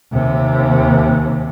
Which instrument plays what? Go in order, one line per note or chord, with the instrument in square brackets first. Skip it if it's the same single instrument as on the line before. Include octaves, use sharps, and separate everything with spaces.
[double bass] D#2 C3